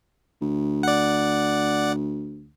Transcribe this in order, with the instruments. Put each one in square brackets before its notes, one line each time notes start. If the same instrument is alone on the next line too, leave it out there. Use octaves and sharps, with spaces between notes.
[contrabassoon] D2
[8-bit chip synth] D5 F#5